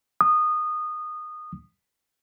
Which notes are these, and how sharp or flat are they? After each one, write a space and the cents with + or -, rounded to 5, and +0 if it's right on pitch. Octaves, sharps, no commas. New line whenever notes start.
D#6 -20